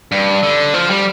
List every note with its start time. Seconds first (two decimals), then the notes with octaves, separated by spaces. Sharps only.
0.12 G2
0.43 D3
0.74 F3
0.90 G3